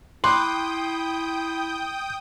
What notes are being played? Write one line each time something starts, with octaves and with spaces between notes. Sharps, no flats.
E4 G5 B5 C6 D6 D#6 F#6 G6